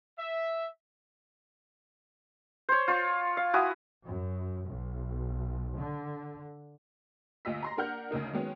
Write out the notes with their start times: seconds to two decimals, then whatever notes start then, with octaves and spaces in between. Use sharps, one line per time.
0.19 E5
2.69 C5 C#5
2.88 F4 C#6
3.37 F5
3.53 E4 F#4 G#5 D#6
4.04 F#2
4.68 B1
5.78 D3
7.45 D2 A#2 F4 D#5 E6 B6
7.62 A#5 C6 A#6
7.77 A#3 D4 A#4 F#5 F6 G6
8.11 D2 C#3 A#3 D#4
8.33 D#3 F#3 G#3 B3 C#4